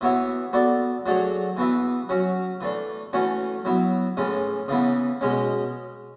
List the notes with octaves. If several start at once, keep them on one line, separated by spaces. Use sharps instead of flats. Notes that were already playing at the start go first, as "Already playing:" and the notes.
E3 B3 F#4 C#5 E5
B3 F#4 A4 D5
F#3 A3 D4 G#4 C#5
E3 B3 F#4 B4 E5
F#3 C#4 F#4
E3 A3 D4
E3 A3 C#4 F#4 C#5
F#3 B3 E4
A2 E3 G#3 C#4
C#3 E3 B3 E4
B2 G#3 C#4